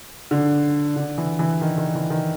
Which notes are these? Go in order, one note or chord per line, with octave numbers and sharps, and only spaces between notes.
D3
D3
E3
E3
D#3
D#3
E3
D#3